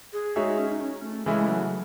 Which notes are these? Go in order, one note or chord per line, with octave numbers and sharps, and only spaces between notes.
G#4
G#3 D#4 F#4 G#4 C#5 E5
C#4
D#4
C#4
A3
C#3 E3 G#3 A3 E4
F#3